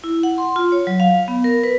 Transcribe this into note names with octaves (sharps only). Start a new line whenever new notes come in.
E4
F#5
C6
F4
C#5
F#3
F5
B3
A#4
B4